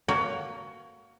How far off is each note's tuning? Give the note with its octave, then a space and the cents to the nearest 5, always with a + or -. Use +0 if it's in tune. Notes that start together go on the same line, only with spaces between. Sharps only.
A#3 -5 F#4 +5 C#5 +20